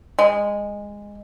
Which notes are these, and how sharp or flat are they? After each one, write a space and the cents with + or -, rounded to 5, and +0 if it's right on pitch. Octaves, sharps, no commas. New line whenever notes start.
G#3 -15